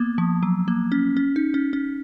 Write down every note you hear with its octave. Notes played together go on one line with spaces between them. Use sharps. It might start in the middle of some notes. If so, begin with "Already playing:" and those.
Already playing: A#3 B3
F3
F#3
A#3
C#4
C#4
D#4
C#4
C#4